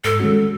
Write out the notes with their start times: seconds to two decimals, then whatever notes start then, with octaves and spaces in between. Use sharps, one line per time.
0.05 G#2 A4
0.20 D#3 G#3 C#4 F#4